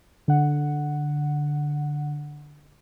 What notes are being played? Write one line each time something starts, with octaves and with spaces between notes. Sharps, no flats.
D3 F#5